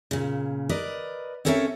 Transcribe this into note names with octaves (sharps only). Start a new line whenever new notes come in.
A#2 C#3
A#4 B4 D5 D#5
C4 C#4 A4 A#4 C#5 E5